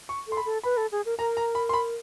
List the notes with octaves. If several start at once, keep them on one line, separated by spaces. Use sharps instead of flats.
C#6
A4 C6
B5
A4
B4 B5
A4
G#4
A#4
A#4 A#5
A#5
B5
C6
B5